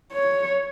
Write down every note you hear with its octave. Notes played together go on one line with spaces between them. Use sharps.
C#5